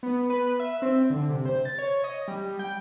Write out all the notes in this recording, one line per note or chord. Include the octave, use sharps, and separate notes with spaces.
B3
B4
E5
C4
D3
C3
C5
A6
C#5
D#5
G3
G5